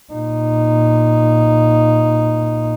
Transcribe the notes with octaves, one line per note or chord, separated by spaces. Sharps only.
A#2 D#4